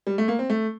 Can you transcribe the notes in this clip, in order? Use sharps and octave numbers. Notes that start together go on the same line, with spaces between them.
G3
A3
A#3
C4
A3